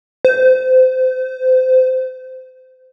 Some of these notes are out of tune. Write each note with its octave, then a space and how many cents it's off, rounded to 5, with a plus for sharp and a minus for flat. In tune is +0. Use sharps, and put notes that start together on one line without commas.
C5 -25